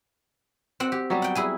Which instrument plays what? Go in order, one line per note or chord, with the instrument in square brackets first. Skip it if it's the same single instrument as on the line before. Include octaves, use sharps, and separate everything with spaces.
[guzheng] C4 F#4 F#5
G4
[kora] F#3 G3 B3
[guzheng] F#5 G5
E4 G#4 G#5